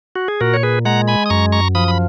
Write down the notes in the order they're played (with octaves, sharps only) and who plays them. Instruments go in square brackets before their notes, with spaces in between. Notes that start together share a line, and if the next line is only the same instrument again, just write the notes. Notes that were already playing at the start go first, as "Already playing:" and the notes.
[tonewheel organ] F#4
G#4
A#2 F#4 A#4
C#5
G#4 B4
G#3 F#5 A#5
G#5 B5
D#6
F#2 A#5 C#6
A#5 C#6
F3 B5 D#6
B5